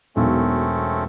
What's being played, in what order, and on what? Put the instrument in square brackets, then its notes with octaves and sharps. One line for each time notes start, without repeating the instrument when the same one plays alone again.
[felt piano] E1 B1 [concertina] A3 C4 C#4